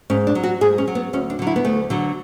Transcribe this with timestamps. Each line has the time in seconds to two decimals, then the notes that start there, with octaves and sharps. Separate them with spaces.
0.10 G#2 C#4
0.27 D4
0.35 F#3
0.44 F#4
0.61 G#2 G#4
0.78 C#4
0.87 F#3
0.95 B3
1.13 D2 C#4
1.30 D4
1.39 D3 F#3
1.47 E4
1.56 B3
1.65 D2 A3
1.90 D3 F#3